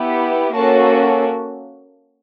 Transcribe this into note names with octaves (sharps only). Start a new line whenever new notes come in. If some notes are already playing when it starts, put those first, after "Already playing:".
Already playing: B3 E4 G4
A#3 C#4 F#4 A4 A5